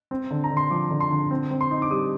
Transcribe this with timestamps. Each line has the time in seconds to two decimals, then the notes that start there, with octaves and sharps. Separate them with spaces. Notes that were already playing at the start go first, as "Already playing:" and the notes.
0.11 C4
0.31 D3
0.44 A#5
0.50 D3
0.57 C6
0.71 F3 D6
0.90 D3
1.00 C6
1.11 D3
1.31 C4
1.51 C4
1.61 C6
1.71 D#4
1.82 D6
1.91 G3 D#6